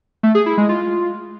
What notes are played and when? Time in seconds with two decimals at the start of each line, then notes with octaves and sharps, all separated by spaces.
0.23 A3
0.35 G#4
0.46 E4
0.58 G#3
0.69 F4